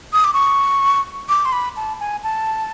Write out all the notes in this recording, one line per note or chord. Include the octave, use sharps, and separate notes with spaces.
D#6
D6
C#6
D6
C6
B5
A5
G#5
A5